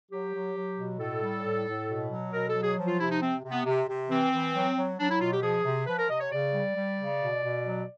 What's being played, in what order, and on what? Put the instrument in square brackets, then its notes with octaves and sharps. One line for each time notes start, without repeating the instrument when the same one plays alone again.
[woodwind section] F#3 G4
F#3
F#3
B2
A2 A4
G3
A2
A2
B2
F#3
B2 A#4
A4
F#3
G#4
F3
F4
C3 E4
D#4
C3 C4
C3
B3
C3
C3
E3 C4
E3
F#3
F#3
F#3 D4
E4
B2 F4
G4
F3 G#4
C3
F3 B4
A#4
C3 D#5
C#5
C#3 D5
G3
G3
C#3
B2
B2
F#3